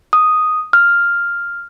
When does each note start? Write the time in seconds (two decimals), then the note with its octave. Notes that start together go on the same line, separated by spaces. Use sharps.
0.13 D#6
0.73 F6